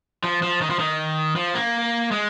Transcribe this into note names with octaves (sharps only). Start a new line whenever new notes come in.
F3
F3
D#3
F3
D#3
F3
A#3
G#3